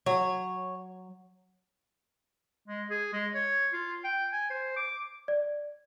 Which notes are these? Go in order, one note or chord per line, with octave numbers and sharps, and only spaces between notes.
F#3 C#5
G#3
G#4
G#3
C#5
F4
G5
G#5
C5
D6
D5